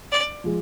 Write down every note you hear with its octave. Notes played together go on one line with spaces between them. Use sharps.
D5
F3 G#3